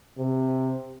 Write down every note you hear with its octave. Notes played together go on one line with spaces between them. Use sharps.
C3